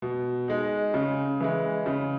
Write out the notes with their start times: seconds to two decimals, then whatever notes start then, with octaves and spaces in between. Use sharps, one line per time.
0.02 B2
0.48 G#3 D#4
0.94 C#3
1.40 E3 G#3
1.86 C#3